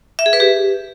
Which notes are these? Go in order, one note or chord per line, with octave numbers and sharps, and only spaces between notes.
E5
G#4
B4
G4